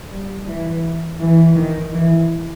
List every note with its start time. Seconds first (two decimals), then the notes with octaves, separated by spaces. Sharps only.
0.10 G3
0.47 E3
1.20 E3
1.56 D#3
1.92 E3